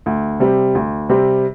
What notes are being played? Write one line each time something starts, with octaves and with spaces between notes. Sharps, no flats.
D2
C3 G3 C4
D2
C3 G3 C4